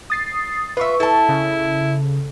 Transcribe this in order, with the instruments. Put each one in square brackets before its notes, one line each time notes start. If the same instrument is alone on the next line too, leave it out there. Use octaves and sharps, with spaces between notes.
[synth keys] D#6 A6 C7
[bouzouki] F4 E5 [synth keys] B4 C#6
[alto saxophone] E4 [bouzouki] A4 A5
[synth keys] C#3